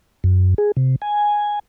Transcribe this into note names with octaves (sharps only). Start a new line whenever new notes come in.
F#2
G#4
C3
G#5